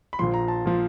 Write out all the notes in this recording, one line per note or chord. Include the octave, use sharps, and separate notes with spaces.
B5
A#1 A#2 F3 C6
A#5
A5
A#2 F3